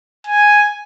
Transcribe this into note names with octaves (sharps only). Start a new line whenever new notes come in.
G#5